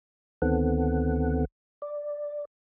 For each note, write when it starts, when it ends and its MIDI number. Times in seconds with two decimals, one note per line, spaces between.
0.42 1.45 38
0.42 1.45 51
0.42 1.45 59
0.42 1.45 60
0.42 1.45 69
0.42 1.45 78
1.82 2.45 74